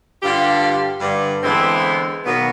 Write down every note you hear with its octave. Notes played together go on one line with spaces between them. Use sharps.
G2 D3 F4 G4
G2 D3
D3 E3 G#3 B3 C4 E4
B2 D#3 F#3 A#3 B3